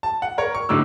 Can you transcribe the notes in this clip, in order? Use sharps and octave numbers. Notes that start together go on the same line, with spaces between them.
A5
F#5
A#4 C#5
C#6
A2 D3 F#3 D#4 D6 E6